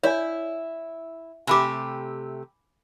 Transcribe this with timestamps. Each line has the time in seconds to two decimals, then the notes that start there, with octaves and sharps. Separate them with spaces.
0.03 E4 C#5 D5 G#5
1.47 C3 A3 G4 G#5 B5 D6